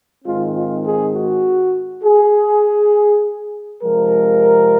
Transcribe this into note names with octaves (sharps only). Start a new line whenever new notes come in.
G#2 D#3 G#3 C4 F4
F4
G#4
F#4
G#4
C3 F3 G#3 A#4